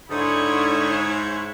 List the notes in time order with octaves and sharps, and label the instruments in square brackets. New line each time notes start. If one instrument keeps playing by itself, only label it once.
[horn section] G#2 [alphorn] D3 [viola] E4 C#5 [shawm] D#6